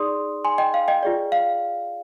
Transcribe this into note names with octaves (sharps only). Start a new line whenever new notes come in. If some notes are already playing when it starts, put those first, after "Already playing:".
Already playing: D#4 G#4 D5 C6 D#6
G#5 C6
D#5 G5
F5
D#5 G5
F4 G#4 D5
F5